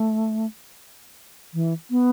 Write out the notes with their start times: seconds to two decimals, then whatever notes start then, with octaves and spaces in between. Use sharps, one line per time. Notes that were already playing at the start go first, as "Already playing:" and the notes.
Already playing: A3
1.54 E3
1.91 B3